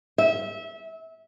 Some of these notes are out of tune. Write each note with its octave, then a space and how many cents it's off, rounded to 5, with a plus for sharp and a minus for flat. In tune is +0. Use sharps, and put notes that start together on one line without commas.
E5 -25